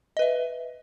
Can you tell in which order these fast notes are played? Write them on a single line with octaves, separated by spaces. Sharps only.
D#5 B4 E5